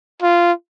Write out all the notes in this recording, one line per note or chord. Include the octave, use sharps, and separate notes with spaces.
F4